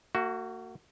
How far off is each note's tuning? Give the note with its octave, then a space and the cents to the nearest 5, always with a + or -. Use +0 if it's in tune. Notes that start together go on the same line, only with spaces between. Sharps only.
A#3 -40 F#4 +10